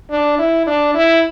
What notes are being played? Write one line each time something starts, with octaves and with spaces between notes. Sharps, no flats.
D4
E4
D4
E4